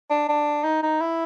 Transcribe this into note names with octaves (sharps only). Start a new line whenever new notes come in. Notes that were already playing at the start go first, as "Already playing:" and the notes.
D4
D4
D#4
D#4
E4